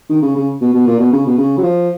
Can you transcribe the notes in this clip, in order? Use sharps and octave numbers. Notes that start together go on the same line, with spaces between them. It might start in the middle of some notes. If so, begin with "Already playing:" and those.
D#3
C#3
C#3
B2
B2
A#2
B2
C#3
B2
C#3
F#3
F3